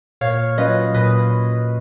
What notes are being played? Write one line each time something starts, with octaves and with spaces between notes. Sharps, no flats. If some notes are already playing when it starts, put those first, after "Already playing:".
A#2 C#5 F5
F#3 C#4 F4 B4 D#5
A#2 B4 D#5